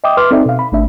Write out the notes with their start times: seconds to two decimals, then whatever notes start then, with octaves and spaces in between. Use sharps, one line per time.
0.04 D#5 E5 G5 D6 D#6
0.17 B4 C6 D6 F6
0.31 C4 D#4 A4 D5 E5
0.46 B2 F5
0.59 B5
0.72 G#1 A3 D4 E5